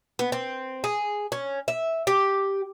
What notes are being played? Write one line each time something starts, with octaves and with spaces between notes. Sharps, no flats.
B3
C4
G#4
C#4
E5
G4